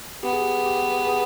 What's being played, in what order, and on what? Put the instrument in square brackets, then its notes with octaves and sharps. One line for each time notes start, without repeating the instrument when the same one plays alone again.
[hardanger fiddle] B3 [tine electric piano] G4
[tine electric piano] G#4
G4
G4
G#4